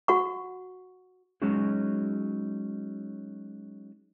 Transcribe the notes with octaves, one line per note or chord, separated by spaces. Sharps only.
F#4 F#5 C#6
F#3 G#3 C#4 D#4 F#4 G#4